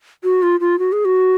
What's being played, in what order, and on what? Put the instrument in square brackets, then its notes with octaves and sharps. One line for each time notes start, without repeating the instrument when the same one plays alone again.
[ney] F#4
F4
F4
F#4
G#4
F#4